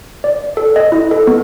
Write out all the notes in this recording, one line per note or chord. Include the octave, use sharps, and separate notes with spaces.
D5
A4
D#5
E4
A4
B3